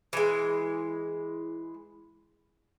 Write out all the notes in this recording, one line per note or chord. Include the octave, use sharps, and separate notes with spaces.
E3 G#3